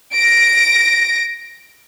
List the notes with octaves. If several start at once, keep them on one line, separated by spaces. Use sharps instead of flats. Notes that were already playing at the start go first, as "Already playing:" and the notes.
A#6 D7